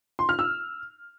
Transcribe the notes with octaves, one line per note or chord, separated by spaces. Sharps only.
C6
F6
E6